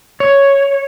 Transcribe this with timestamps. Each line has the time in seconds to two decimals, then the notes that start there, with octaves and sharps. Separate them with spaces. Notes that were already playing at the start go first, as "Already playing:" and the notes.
0.20 C#5